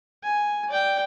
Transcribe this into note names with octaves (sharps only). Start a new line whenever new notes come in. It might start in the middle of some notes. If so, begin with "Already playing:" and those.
G#5
D5 G5